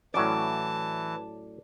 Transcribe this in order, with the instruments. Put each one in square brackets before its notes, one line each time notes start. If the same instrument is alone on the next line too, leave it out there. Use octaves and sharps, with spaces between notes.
[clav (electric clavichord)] A2 F#3 C#4 [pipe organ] E3 [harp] D5 [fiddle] A5